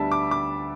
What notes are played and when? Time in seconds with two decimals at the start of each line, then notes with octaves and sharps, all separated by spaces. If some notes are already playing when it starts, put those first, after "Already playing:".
Already playing: D2 D3 G3 B3 E5 A5
0.12 D6
0.31 D6